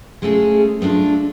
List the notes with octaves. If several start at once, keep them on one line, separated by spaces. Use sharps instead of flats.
G#3 A3 C#4 F4 G#4
G#3 A3 C#4 D4 F4